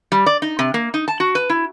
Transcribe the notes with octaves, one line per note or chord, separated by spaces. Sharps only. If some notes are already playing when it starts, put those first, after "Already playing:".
G3
D5
D#4
C3
A#3
D#4
A5
F#4
B4
E4